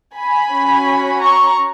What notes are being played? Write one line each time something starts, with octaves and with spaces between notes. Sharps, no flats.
G#5 B5
C#4 F#4
A#5 C#6